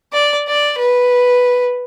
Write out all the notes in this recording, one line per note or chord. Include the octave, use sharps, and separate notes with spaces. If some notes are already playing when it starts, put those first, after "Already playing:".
D5
D5
B4